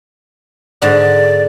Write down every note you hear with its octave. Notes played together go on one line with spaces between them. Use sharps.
G#2 D3 D5